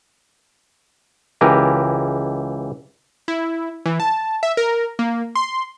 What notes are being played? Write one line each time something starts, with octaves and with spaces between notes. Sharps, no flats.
C#2 E3 G4 A#4 G#5
E4
E3
A5
E5
A#4
A#3
C6